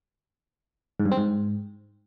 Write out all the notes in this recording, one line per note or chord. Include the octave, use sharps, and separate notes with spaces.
G#2
G2
C4
G#2